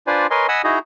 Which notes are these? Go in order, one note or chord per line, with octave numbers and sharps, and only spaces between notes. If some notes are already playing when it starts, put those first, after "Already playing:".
D4 F4 B4 C5 D5 G#5
A#4 B4 C#5 D#5 G#5 C6
D#5 F#5 G#5 B5 D#6 E6
D#4 E4 F#4 G#4 D#5 A#5